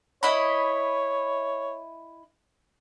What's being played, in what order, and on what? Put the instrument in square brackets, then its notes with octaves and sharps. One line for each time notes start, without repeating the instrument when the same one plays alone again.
[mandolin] E4 D#5 B5 [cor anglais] C#5